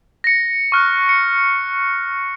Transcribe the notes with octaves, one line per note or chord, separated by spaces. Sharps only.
A#6 C#7
C#6 F6 F#6
C#7